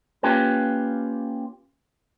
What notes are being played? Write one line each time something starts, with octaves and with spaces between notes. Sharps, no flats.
A#3 C#4 F4 G4 B4